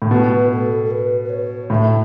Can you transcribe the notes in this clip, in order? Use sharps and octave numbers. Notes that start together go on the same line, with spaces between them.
A2
B2 B4
A4
A4
B4
B4
C#5
A2 E5